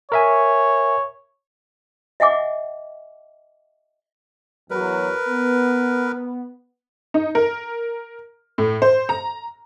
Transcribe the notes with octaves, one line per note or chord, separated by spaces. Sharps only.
A#4 C#5 E5 G#5
D#5 E5 F#5 G#5 D6
E2 F#3 A#4 B4
B3
D#4
A#4
A2
C5
A#5